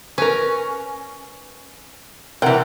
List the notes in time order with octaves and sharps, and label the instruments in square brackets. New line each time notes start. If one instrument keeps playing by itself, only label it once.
[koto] C#4 [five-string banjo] A#4 B4
[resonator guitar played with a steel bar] C3 E3 [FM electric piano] A#4 F#5 F#6 [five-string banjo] G5